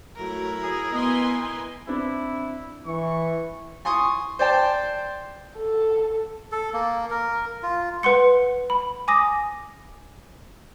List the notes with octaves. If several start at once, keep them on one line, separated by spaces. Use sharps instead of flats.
F#3 A3 E4 A#4
G#4
B3 B4 D#5 G#5 C6
C4 D4 E4
E3 C#6
G#5 C6 C#6 D#6
C5 D5 G5 A5
A4
A4
A#3
A#4
F4
B4 F#5 C6 C#7
B5
G#5 D6 D#6 A#6